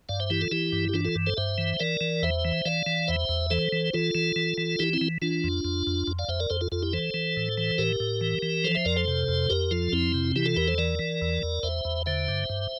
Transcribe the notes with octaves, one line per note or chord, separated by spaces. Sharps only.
G2 D5 F5
C5 E5
E3 E4 G4
F4 A4
E3 E4 G4
G2
G4
E3 D4 F4
F4 A4
G2
A4 C5
G2 C5 E5
E3
E3 A#4 D5
E3
E2 C5 E5
E3
E3 D5 F5
E3
E2 C5 E5
E2
E3 A4 C5
E3
E3 F4 A4
E3
E3
E3
E3 E4 G4
C4 E4
E3
E3 D4 F4
F2
F2
F2
F2
D5 F5
F2 C5 E5
A#4 D5
F2 A4 C5
F4 A4
F2 F4 A4
E4 G4
E3 A4 C5
E3
A2
E3
A2 G4 A#4
A2
E3
E3
F3 A4 C5
C5 E5
F2 A#4 D5
A4 C5
C3
F2
F2 G4 A#4
F3 F4 A4
F2 C4 E4
C3
E3 E4 G4
F4 A4
E2 G4 A#4
A4 C5
E3 A#4 D5
E3
E2
E2
E2 C5 E5
E2
D3 C5 E5
G2
G2